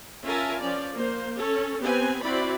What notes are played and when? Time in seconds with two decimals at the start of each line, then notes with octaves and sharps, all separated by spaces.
0.24 C#4 F4 A#4 E5 G#5 A5
0.60 F3 C#4 D5
0.95 A#3 C5
1.37 C#4 A4 C#5
1.82 B3 C4 G4 B4 G#5
2.22 C4 E4 F#4 D5 B5